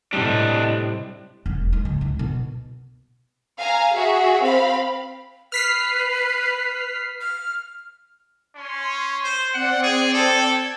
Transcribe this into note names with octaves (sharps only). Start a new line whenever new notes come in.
A2 C3 G3 D4 D#5
E1
G#3
C#2
E3
B2
F5 G#5 A#5
F#4 G#4 E5
C4 F5 B5
B4 F6 B6 C7
F6
C#4 C6
C5
C4 D5 F#5 G5
G#4
A4
G#6